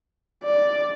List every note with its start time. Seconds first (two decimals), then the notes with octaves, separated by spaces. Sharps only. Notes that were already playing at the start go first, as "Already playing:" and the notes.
0.44 D5